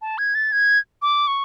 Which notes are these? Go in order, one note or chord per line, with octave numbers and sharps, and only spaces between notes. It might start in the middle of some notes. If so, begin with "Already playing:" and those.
A5
G#6
A6
G#6
D6
C#6